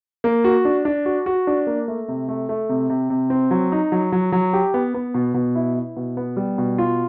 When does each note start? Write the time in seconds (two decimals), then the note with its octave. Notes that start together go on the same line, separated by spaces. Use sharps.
0.24 A#3
0.44 F#4
0.65 D4
0.85 D4
1.05 F#4
1.26 F#4
1.47 D4
1.67 A#3
1.88 A3
2.08 C3
2.28 A3
2.49 A3
2.69 C3
2.90 C3
3.10 C3
3.30 C4
3.51 F#3
3.72 D#4
3.92 F#3
4.12 F#3
4.32 F#3
4.53 G4
4.74 B3
4.94 B3
5.14 B2
5.34 B2
5.55 E4
5.75 E4
5.97 B2
6.17 B3
6.37 G3
6.58 B2
6.78 F4